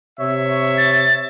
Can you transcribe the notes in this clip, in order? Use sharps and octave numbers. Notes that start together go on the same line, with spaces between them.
C3 C#5 E5
A6